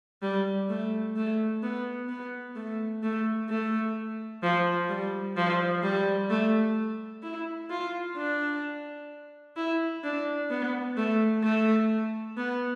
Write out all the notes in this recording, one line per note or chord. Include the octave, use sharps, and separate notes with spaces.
G3
A3
A3
B3
B3
A3
A3
A3
F3
G3
F3
G3
A3
E4
F4
D4
E4
D4
B3
A3
A3
B3